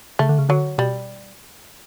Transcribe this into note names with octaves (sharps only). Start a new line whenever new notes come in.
C#3 A3
D3
C#3
D3 F#3
B2 G3